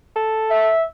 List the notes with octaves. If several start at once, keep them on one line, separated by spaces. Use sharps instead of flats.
A4
E5